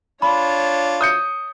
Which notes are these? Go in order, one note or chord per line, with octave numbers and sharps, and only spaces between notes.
D4 F4 C#5 B5 C6
D#6 G6 C#7